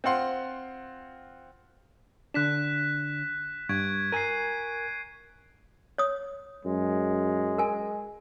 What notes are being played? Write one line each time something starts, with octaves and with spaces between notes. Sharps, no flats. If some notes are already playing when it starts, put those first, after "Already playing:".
C4 F4 F#5 C6
D3 D4 F#6 B6 E7
G2 C#6 G#6 D7
A#4 G#5 C7 D#7
C#5 D#6
F#2 G#3
A#4 G#5